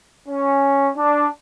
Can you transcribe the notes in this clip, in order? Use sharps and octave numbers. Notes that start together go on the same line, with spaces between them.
C#4
D4